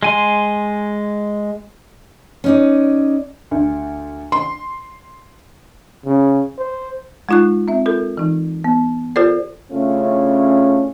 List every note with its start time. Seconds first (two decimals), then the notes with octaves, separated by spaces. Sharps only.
0.03 G#3 G#5 C6
2.44 C#4 D#4 D5
3.51 D2
4.32 C6
6.06 C#3
6.58 C5
7.29 G#3 D#4 F4 C#6 F#6
7.68 C4 E5
7.86 F4 A4 A#4
8.17 E3 D#4
8.64 B3
9.16 F4 G4 A4 A#4 C5 D5
9.71 C#3 A3 C#4 D4 E4 F4